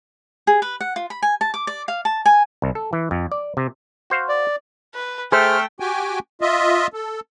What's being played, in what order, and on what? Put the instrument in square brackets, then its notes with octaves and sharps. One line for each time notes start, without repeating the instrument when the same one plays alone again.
[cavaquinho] G#4
B4
F#5
F4
B5
G#5
A5
D6
D5
F5
A5
G#5
[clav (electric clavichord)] C2
A4
E3
F2
D5
C3
F#4 C5 F5
[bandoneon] D5
[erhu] B4
[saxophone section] A3 [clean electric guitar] G#4 C5 [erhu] G5 [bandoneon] F6
[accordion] F#4 G4 G5 G#5
F4 D#5 E5
A4